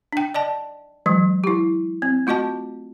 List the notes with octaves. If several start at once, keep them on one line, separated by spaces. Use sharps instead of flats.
D4 G5
D5 D#5 A5
E3 F#3 G#3
E4 G4
C4
A3 F4 F#4 D#5 A5